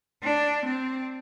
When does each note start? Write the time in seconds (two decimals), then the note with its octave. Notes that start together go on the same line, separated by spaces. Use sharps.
0.23 D4
0.65 C4